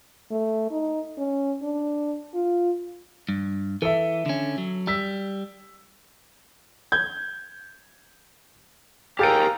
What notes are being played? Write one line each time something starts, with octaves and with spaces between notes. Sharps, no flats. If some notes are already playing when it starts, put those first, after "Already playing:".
A3
D#4
C#4
D4
F4
G2
E3 A4 E5
D3 C#4
F#3
G3 E6 B6
G6 G#6
G4 G#4 A#4 F5 G5 A#5 A6 D7